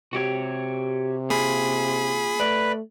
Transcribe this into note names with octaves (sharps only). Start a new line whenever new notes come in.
C3 F#4 G4 C#5
A#3 C#4 F4 G#4 B5
A3 B4 D5